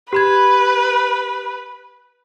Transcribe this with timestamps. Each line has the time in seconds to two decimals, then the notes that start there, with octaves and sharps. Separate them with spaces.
0.13 G4 B4 B5 G#6